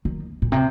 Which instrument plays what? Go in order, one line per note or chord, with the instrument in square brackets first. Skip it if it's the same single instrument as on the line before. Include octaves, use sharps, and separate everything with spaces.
[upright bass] D#3
A#2
C3